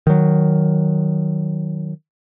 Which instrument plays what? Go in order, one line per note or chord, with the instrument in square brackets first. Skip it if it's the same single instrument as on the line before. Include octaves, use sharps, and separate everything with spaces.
[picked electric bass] D#3 F#3